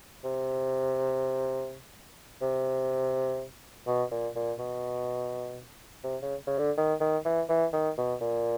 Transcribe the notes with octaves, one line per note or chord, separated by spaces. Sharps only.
C3
C3
B2
A#2
A#2
B2
C3
C#3
C#3
D3
D#3
D#3
E3
E3
D#3
B2
A#2